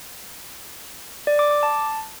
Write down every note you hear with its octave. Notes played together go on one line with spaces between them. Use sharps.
D5
D6
D6
A5